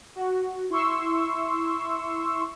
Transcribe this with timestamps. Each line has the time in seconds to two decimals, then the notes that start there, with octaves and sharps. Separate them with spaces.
0.16 F#4
0.70 E4 C6 C#6 E6